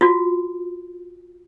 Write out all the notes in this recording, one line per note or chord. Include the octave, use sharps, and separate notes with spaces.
F4 F#4